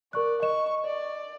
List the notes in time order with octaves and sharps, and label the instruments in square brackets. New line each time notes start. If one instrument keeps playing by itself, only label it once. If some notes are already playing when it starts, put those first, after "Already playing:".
[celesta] A#4 C#6 F#6 [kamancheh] D5
[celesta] D#5 E7 [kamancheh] C#6
[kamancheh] D5